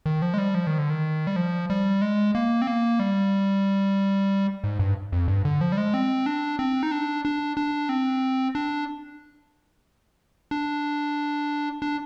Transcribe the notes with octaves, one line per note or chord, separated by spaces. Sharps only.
D#3
F3
G#3
G3
F3
D#3
D3
D#3
G3
F3
G3
G#3
A#3
C4
A#3
G3
G#2
G2
F2
G2
D3
F3
G3
G#3
C4
D4
C4
D#4
D4
D4
D4
C4
D4
D4
D4